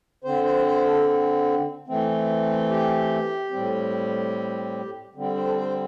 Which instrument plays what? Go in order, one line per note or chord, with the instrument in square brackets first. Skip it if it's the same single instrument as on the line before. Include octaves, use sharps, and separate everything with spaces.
[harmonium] D3 C4 C5
C5
C5
A4
E3 A3 C4
G4
A2 G3 C4
D3 G3 C4
C5
A4
C5